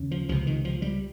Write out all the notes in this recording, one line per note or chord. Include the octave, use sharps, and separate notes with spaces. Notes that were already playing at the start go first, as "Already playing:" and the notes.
Already playing: D#2 C#3
F3
C#2 C3 F3
D#3
F3
G3